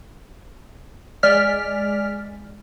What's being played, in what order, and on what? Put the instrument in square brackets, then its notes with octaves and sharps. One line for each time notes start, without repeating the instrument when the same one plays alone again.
[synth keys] G#3 D5 F6 B6